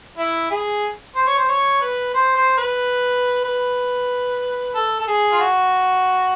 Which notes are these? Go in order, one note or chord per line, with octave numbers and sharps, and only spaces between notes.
E4
G#4
C5
C#5
C5
C#5
B4
C5
C5
B4
B4
A4
A4
G#4
F4
F#4